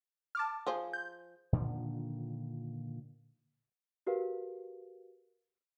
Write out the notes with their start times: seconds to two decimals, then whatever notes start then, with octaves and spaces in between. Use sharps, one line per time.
0.35 A5 D6 F6
0.67 F3 G#4 C5
0.93 G6
1.53 A#2 D3 D#3 F3
4.07 F#4 G4 A#4 B4 F5